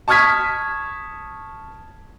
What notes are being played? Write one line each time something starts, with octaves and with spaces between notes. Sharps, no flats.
A5 C#6 D#6 F6 G#6 B6